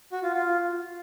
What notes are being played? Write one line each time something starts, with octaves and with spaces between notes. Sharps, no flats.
F#4
F4
F4